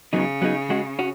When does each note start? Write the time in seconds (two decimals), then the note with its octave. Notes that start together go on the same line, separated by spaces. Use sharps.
0.13 C#3 F#3 B3 D#4 G#4
0.42 F#3 B3 D#4 G#4
0.70 G#3 C#4 F#4
0.99 C#4 F#4